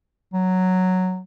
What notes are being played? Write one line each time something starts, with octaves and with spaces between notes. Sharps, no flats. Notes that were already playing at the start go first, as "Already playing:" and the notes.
F#3